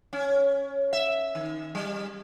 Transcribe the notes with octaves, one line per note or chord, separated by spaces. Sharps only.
C#4
E5
D#3
G3